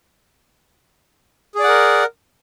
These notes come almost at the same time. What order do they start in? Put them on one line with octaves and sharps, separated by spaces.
G#4 D5 F#5 A#4